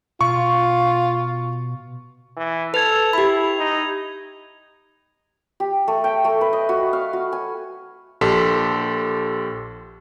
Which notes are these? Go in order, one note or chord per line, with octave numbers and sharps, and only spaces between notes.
B2 F4 C#6
E3
A4 B4 G#6 F7
E4 G4 B5
D#4
G4
A3
G5
A3
B4
D#5
F#4
F5
F#4
G#5
A#1 G4 A4 C6 B6